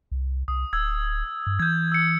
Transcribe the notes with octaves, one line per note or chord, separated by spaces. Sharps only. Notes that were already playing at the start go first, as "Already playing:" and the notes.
C2
C2 D#6
D1 E6 G#6
G2
E3 G6 G#6
E6 C#7